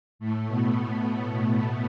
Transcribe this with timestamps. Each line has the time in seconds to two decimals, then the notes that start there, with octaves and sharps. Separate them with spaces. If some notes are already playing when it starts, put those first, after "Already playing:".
0.19 A2 A3
0.47 B2 B3
0.76 B2 B3
1.05 A2 A3